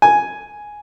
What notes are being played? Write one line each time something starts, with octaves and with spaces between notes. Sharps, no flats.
G#5